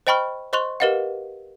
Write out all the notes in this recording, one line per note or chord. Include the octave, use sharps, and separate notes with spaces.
C5 D#5 G5 B5 C#6 F6
C5 D#5 C6 C#6 F#6 F7
G4 A#4 B4 D#5 F5 F#5